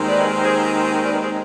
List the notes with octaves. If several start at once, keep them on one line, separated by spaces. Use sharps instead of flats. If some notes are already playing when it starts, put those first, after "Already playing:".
Already playing: D#2 D#3 G#3 C4
B4 D5
G#4 C5
B4 D5
G#4 C5